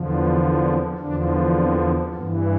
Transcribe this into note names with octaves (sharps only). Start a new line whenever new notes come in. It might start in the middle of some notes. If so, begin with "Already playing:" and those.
Already playing: E2 D3 F3
B3
C4
E2 D3 F3 D4
C4
G2 E3 B3